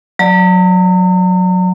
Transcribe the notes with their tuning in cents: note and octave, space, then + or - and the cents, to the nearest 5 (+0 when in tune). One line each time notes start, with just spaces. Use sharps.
F#3 -15 D5 +0 A#5 -40